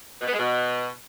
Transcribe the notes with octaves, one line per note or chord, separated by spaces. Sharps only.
B2
B3
G#3
B2